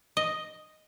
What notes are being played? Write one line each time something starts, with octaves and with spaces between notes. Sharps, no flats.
D#5